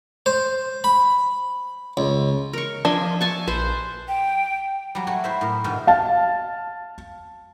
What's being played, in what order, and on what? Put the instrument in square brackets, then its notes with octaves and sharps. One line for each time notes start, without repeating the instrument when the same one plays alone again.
[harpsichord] C5
B5
C#2
[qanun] A#4 C#6
[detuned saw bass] F3 [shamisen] D4 [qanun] D#5 E5 G#5
[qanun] G#5 A5 C#6
[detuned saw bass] A#1 [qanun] B4 C5
[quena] G5
[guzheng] F#3 G3
A3 F#4 G#5
E4 C5 E5
A2 A#4
G#2 B2 D3 D#3
[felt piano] F5 A5